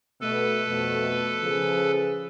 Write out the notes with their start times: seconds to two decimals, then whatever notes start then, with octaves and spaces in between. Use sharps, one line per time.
0.21 B2 A3 A4 B4
0.68 F2 B2 A3
1.43 C#3 F3 G#4